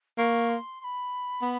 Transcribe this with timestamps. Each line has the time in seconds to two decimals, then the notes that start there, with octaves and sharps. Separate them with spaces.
0.18 A#3 C#6
0.49 C6
0.81 C6
0.84 B5
1.42 B3